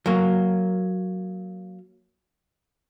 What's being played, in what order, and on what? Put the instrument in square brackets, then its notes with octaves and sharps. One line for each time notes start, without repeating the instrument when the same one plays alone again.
[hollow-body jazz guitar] F#3 A#3